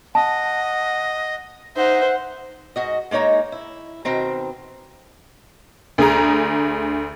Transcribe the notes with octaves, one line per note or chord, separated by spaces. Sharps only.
D#5 F#5 A5
D#4 C5 E5 F#5
G#2 F#4 D#5
G#3 A#3 D#4 C#5 A#5
E4
B2 D#3 C4 A#5
D2 G#4 A#5